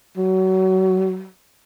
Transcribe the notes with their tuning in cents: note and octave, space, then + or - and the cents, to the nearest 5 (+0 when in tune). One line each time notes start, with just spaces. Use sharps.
F#3 +25